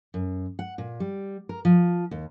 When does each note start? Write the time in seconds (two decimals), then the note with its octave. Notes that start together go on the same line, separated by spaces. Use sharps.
0.14 F#2
0.59 F#5
0.78 A#2
1.00 G3
1.49 A#4
1.65 F3
2.11 D#2